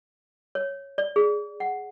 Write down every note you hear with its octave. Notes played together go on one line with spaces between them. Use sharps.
C#5
D5
G#4
F#5